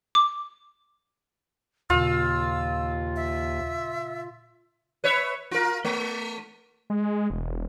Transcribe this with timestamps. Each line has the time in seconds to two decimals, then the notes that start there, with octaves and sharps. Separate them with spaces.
0.15 D6
1.90 D#2 A#2 C#3 F4 E6
3.16 E5
5.04 B4 C#5 E5
5.51 F4 A#4
5.85 A3
6.90 G#3
7.30 E1